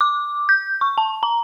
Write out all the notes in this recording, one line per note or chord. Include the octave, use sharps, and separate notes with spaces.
D6
G6
C#6
A5
A#5